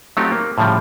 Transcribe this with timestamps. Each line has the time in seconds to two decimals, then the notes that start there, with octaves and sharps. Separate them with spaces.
0.17 F#3 A3 C4 D#4 F4 G4
0.32 A#3
0.58 A2 C#3 F3 G3